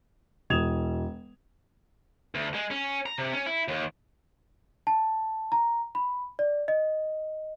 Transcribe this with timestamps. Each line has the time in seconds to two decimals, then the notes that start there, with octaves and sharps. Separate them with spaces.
0.50 E1 E3 D#6 G#6 E7 F7
2.35 D2
2.54 G#3
2.71 C#4
3.06 A#5
3.18 C3
3.33 C#4
3.46 E4
3.68 D#2
4.87 A5
5.52 A#5
5.95 B5
6.39 D5
6.68 D#5